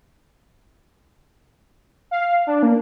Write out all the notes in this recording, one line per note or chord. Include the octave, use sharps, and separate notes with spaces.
F5
D4
A#3